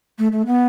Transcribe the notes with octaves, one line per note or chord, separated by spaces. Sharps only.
A3
A3
B3